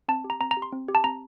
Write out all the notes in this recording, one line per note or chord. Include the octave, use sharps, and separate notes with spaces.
C4 A5
G4
A#5
C4 A#5
A#5
G4
C6
C4
G4
A5
C4 A#5